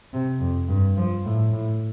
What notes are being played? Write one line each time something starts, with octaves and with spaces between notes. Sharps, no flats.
C3
F2
G2
F3
A2
A2